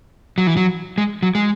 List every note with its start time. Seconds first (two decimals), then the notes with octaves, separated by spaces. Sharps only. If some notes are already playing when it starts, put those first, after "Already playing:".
0.38 F#3
0.47 E3
0.57 F#3
0.98 G#3
1.23 F#3
1.35 G#3